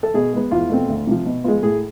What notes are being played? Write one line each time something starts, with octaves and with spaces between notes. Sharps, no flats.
A4
B2 G#4
G#3 B3
E2 F4
B2 A3 C4
D2
C3 F3
B2
G#3 B3 F4
A2 G#4